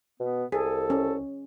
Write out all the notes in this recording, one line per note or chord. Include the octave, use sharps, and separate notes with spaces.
B2 B3
C2 G#4 A4
C#4